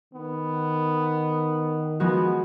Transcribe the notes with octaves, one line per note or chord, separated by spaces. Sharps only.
D#3 B3
F3 G#3 B3 F#4